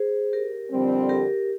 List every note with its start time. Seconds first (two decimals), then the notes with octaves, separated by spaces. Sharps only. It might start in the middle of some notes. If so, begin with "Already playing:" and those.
Already playing: G#4 C5
0.33 G4 A#4
0.71 F2 D3 G3 C4
1.09 G4 A#4